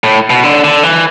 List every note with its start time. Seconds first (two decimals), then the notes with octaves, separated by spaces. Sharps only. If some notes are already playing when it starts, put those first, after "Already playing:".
0.04 A2
0.30 B2
0.44 D3
0.64 D3
0.83 E3